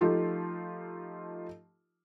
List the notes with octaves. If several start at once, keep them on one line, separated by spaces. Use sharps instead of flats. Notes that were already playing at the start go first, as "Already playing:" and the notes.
F3 A3 D#4 F4 G4